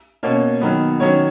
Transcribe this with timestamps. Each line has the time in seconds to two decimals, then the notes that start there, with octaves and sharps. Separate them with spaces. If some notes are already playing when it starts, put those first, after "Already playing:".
0.23 B2 A#3 C#4 C#5
0.61 D#3 F#3 B3
1.00 D#3 F#3 C#4 C#5